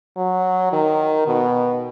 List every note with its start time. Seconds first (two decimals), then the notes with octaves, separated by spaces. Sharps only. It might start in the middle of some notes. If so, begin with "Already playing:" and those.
0.17 F#3
0.72 D#3
1.27 B2